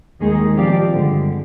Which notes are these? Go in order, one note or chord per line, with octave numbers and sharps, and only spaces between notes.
D#2 D#3 G#3 D#4 G#4
F3 C4 G4 D5 F5
G2 D3 G#3